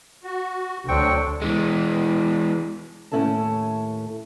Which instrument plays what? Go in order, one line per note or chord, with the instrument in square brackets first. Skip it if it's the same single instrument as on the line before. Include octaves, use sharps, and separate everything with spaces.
[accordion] F#4
[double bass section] D2 [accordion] F#3 D4 [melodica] C4 G5 C#6
[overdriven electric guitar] E3 G#3
[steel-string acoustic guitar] D#2 A2 C#4 E4 A4 A5